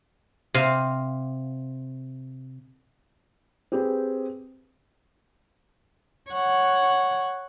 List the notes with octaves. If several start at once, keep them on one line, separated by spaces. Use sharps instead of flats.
C3 F5
C4 G4 G#4 B4
C#5 F#5